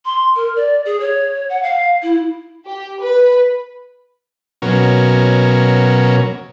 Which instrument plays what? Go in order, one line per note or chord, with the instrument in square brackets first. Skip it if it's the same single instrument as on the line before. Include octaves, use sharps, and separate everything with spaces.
[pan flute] C6
A#4
D5
G#4
C#5
F#5
F5
E4
[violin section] G4
B4
[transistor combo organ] B2 F#3 A#3 C#4